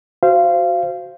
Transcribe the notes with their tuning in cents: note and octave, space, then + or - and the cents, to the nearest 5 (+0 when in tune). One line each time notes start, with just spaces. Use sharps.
F#4 +0 C5 +0 F5 -25